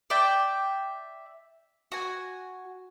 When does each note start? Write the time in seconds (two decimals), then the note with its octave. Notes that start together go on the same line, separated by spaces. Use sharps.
0.10 D5 E5 G5
1.92 F#4 G#5